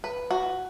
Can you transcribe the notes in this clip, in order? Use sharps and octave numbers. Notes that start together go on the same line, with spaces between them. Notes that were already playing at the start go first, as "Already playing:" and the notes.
B4
F#4